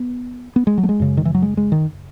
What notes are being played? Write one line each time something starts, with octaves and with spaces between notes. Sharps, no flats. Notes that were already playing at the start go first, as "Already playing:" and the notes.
Already playing: B3
B3
G#3
F#3
A3
G#3
F#2 C#3
D#3
E3
F#3
G#3
G#3
D#3